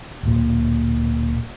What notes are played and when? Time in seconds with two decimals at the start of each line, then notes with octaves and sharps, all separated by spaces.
0.23 D1 A#2